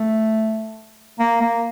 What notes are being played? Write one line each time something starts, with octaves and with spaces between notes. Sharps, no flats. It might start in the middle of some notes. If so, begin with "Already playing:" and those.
Already playing: A3
A#3
A#3